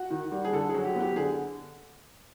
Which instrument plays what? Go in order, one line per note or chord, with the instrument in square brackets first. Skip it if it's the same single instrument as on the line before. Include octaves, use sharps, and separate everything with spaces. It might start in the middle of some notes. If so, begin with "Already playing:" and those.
Already playing: [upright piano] F#4
D#3
G3
G#4
D3 A4
G#4
F#3
G4
B3
G4
D3 G#4